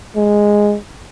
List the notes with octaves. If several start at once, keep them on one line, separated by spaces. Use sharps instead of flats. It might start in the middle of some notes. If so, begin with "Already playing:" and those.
G#3